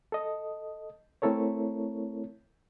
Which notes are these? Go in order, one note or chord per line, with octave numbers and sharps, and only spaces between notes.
A4 D#5
A3 C4 E4 A4 A#4 C#5